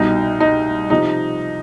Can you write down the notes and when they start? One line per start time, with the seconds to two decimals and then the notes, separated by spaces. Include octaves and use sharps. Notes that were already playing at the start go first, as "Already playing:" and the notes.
Already playing: C2 B2 D#4
0.40 D#4
0.90 C3 F3 D#4